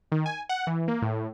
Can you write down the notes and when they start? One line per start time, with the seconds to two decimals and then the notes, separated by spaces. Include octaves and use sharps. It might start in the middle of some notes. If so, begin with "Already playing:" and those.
0.12 D#3
0.26 G#5
0.49 F#5
0.67 E3
0.88 A#3
1.02 A2